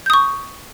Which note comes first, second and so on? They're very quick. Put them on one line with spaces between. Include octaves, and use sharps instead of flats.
G6 D#6 C#6